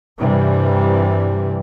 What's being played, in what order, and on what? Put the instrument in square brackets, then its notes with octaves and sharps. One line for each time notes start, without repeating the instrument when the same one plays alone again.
[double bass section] G2 C3 E3 G3